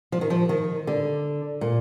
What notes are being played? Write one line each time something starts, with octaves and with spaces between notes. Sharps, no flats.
F3
D#3
F3
D#3
D3
A#2